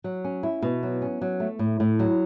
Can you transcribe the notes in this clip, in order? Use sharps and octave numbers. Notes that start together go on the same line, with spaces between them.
F#3
C#4
E4
B2
F#3
C#4
F#3
A3
A2
A2
F#3